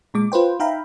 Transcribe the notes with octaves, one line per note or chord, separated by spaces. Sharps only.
A#2 G#3 D6
F4 B4 C5 G5
D#4 E5 F5 G5 A#5 B5